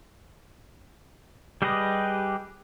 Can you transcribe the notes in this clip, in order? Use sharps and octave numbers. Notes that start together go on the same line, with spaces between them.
G3 G4 G#4 B4 D#5